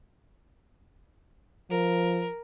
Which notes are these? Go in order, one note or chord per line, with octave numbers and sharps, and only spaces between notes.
F3 A#4